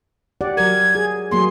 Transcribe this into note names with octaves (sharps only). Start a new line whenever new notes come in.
G4 D5 F#5
F#3 A#4 G#6
G#4
F#3 A#3 G#4 C6